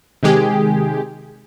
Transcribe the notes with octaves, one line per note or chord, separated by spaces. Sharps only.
C3 D#3 G#3 G4 G#4